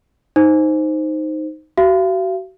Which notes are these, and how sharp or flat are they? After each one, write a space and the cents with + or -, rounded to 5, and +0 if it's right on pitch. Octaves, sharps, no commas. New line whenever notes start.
D#4 +0 C5 +0
F#4 +35 F5 -40